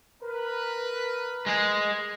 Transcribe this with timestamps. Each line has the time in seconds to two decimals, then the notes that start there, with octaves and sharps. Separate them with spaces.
0.23 A#4 B4
1.46 G#3 G#4